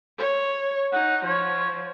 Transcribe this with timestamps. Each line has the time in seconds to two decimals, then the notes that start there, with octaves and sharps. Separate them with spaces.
0.18 C#5
0.93 D#4 F#5
1.25 F3 C#5